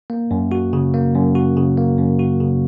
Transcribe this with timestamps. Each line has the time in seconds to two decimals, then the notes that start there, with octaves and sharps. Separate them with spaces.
0.10 A#3
0.31 F#2
0.52 F#4
0.73 C#3
0.94 A#3
1.15 F#2
1.35 F#4
1.56 C#3
1.77 A#3
1.98 F#2
2.19 F#4
2.40 C#3